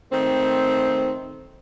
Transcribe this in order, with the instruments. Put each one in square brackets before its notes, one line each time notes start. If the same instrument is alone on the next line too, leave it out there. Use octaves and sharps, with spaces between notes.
[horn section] D#3 A3 C4